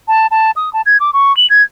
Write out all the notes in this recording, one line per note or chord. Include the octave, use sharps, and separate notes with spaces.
A5
A5
D#6
A5
G#6
D6
C#6
F#7
G#6